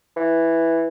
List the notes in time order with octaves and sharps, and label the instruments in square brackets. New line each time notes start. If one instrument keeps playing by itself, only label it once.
[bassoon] E3